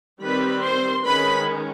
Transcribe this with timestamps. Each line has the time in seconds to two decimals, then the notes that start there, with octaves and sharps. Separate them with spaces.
0.22 D#3 G3 C4 B4 B5
0.63 C5 C6
1.05 D#3 G#3 C#4 B4 B5